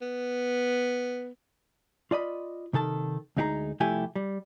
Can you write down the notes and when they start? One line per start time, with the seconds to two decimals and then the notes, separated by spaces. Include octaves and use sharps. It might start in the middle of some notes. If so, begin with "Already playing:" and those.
0.02 B3
2.11 F4 D5 D#5 B5
2.73 C3 D#3 A4 A5
3.37 D2 G#3 D#4 G4 G#4 A#5
3.80 C2 F3 A3 E4 G4 G#5
4.16 G3